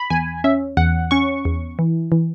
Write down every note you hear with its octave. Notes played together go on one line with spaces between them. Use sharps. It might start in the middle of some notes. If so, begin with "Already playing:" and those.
Already playing: B5
E2 G#5
C#4 E5
E2 F#5
C#4 C#6
E2
E3
E3